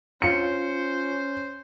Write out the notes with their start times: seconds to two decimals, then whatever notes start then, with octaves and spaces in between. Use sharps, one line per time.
0.22 C#4 F4 C5 C#5 C#7